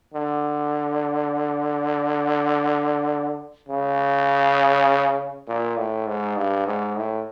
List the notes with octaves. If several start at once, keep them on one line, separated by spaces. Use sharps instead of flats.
D3
C#3
A#2
A2
G#2
G2
G#2
A2